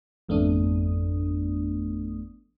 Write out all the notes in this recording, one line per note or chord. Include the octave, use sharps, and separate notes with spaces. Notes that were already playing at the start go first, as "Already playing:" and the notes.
G#1 F2 A3 B3 D4 D#6